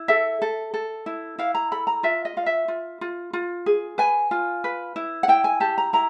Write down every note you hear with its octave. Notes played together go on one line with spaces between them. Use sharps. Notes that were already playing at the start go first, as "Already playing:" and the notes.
Already playing: E4
A4 E5
A4
A4
E4
E4 F5
A#5
A4 B5
A#5
F4 E5
D#5
F4 F5
E5
F4
F4
F4
G#4
B4 G#5
F4
B4
E4
F#5
E4 G5
G#5
G4 A5
A#5
E4 A#5